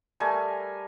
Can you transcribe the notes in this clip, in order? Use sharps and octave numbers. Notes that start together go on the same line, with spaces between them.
G3 A3 A#4 G#5